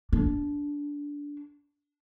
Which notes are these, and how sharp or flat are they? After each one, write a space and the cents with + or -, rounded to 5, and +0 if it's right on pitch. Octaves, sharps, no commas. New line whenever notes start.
D4 -20